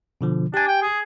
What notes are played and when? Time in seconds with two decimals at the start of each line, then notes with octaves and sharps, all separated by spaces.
0.21 B2 D3 F3
0.54 D4 G4 G#5
0.68 G5
0.82 G#4